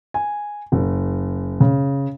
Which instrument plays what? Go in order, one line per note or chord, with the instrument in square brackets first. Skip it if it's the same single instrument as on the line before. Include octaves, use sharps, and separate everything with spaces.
[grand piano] G#5
F#1
C#3